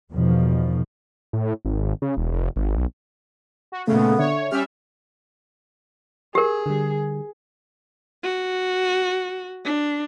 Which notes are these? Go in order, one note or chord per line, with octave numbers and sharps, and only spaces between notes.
E2 B2 D#3 F3
A2
G#1
C#3
E1
F1
G#1
B1
F#4
A#2 C#3 A3 B3 A4
D3 C#5 E5
G3 C#4 E5 F6
G4 G#4 A#4
D3 G3
F#4
D4